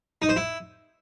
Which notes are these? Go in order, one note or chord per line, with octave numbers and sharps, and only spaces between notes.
D#4
C5
E4